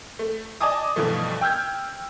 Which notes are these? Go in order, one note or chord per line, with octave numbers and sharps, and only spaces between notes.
A3
D5 D#5 G#5 A5 D6 D#6
G2 B2 E3 F3 A3
G5 E6 F6 G6 G#6